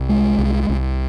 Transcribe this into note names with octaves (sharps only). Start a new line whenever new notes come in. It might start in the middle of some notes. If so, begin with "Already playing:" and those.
Already playing: C2
G#3
C2
C2